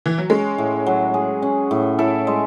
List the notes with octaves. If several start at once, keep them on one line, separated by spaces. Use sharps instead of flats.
E3
F#3
G#3 C#4
A2
F#3
G#4
C#4
A2
E4 A4
G#3